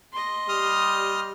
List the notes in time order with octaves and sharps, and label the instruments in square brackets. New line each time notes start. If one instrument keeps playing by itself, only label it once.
[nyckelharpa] D#5 C6
[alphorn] G3 [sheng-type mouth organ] D#6 F6